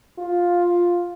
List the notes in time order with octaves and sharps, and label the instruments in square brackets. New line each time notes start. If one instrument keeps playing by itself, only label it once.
[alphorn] F4